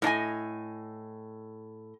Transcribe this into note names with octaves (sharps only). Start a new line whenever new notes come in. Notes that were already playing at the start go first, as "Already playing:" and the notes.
A2 D4 D#5 G#5